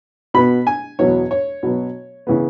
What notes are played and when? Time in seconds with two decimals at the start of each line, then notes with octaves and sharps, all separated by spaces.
0.34 B2 B3 B5
0.67 G#5
0.99 E2 B2 F#3 B3 C#5
1.31 C#5
1.63 B2 F#3 B3
2.27 C#3 E3 B3